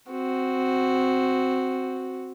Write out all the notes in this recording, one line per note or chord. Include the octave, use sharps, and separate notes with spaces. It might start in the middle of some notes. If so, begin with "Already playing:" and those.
C4 F#4